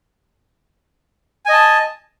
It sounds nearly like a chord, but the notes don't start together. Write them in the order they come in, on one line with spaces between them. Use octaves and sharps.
G#5 D#5 A5